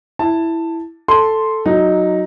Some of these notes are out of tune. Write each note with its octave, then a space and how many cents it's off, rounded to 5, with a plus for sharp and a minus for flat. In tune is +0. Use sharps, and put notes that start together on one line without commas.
E4 +0 A5 +10
A4 +0 C6 +0
F#3 +0 D#4 +0